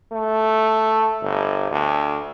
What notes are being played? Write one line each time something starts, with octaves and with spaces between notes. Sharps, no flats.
A3
G1
D2